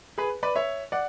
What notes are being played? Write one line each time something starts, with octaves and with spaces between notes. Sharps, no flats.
G#4 B4
B4 D5
C#5 E5
D5 F#5